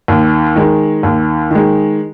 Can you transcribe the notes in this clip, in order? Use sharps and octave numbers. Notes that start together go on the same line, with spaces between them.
D#2
D#3 G#3
D#2
D#3 G#3